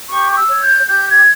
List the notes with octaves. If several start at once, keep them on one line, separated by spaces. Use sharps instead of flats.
G4 C#6
C#6
E6
C#5
G6
G4 G6
G#6